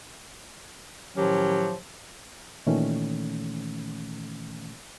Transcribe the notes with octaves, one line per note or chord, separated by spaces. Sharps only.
A2 D#3 F3 F#3 C#4 G4
A#2 D#3 E3 A3 C#4